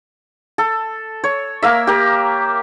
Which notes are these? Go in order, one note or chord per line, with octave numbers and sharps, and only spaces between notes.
A4
C#5
A#3 A#4 E5
G4 A#4